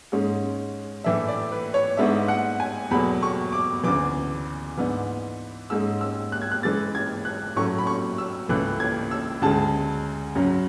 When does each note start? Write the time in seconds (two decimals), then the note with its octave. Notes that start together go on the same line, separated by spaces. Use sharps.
0.12 G#2 G#3 C#4
1.04 A2 E3 A3 D4 E5
1.28 D5
1.52 B4
1.74 C#5
1.97 G#2 G#3 B3 D4 E5
2.28 F#5
2.60 G#5
2.91 E2 B2 F#3 A3 B5
3.23 C#6
3.52 D6
3.83 D2 C#3 E3 D6
4.77 G#2 E3 B3 D4
5.70 G#2 G#3 C#4 E6
6.01 E6
6.32 F#6
6.42 G#6
6.52 F#6
6.63 C#3 E3 G#3 A6
6.95 G#6
7.25 F#6
7.56 A2 F#3 A3 C#4 C#6
7.78 B5
7.87 C#6
8.18 E6
8.49 C#2 C#3 E3 A3 F#6
8.80 G#6
9.11 E6
9.42 D2 C#3 G#3 A5
10.35 F#2 C#3 F#3 C#4